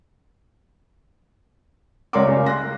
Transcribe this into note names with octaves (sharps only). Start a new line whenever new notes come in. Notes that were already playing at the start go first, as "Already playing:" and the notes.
C#2 A#4 C#5 D5 C6 D6
C#3
C6 F#6 A#6